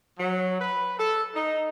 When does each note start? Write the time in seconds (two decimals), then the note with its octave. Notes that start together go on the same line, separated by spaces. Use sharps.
0.19 F#3
0.61 B4
0.99 A4
1.35 D#4